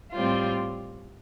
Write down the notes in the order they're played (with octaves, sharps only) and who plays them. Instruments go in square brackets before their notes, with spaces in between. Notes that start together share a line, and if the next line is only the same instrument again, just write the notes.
[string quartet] A2 G3 C4 F4